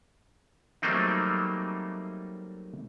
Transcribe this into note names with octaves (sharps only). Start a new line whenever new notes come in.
F#3 G3 A3 A#3 C4 D#4